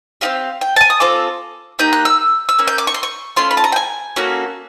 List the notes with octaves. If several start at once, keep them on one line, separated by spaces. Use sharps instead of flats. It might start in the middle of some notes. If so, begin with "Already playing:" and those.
C4 D#4 G4 F5
G5
A5
G#5
D#6
C4 F4 A4 D6
A#3 D#4 G4 G6
F#6
E6
E6
A#3 C#4
G6
D6
C#6
C6
C#6
A3 C#4 F4 C6
B5
A5
A#5
G5
G#5
A#3 C#4 F#4 A4